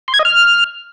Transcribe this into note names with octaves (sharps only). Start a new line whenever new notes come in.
C6
G#6
D#5
F6